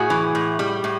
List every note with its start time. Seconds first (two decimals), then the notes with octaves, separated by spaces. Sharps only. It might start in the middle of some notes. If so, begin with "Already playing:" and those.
Already playing: A2 F#4 G#4
0.10 E3
0.35 A2
0.59 G3
0.84 A2